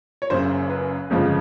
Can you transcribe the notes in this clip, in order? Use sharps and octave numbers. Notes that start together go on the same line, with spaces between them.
C#5
F#1 F#2 C#3 C5
B4
G1 F2 C#3 F3 G#3